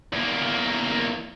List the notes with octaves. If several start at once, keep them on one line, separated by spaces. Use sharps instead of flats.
E2 A#3